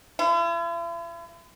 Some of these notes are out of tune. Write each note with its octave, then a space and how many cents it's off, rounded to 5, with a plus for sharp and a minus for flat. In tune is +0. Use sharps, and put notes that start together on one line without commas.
E4 +45